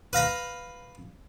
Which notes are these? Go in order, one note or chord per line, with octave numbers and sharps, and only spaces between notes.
B4 F5 A#5 B5